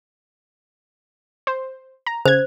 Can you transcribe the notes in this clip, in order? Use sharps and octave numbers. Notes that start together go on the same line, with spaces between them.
C5
A#5
C#3 C5 G#6